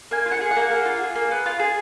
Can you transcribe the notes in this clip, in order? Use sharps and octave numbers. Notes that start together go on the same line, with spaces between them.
A#3 G#5
F4
F#5
G#4
F#5
A#3
A#3
F4
G#4
A#3
B3
F4
G#4